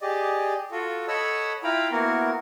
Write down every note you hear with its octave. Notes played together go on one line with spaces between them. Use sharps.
G4 G#4 D5 D#5
F4 F#4 A4
A4 C#5 D#5 F#5 B5 E6
E4 F4 F5 G5 A#5 B5
A#3 B3 E4 F#4 A#4